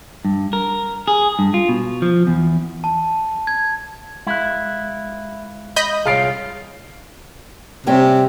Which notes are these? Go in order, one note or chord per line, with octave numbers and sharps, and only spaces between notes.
G2
A#4
G#4
G2
F4
B2
F3
E2
A5
G#6
G#3 E4 F5 F#6
D#5 B5 G6
C2 F4 G#4 C#5 F5 C7 D7
C3 G3 C#4 G5